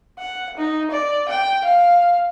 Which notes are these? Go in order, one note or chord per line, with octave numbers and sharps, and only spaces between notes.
F#5
D#4
D5
G5
F5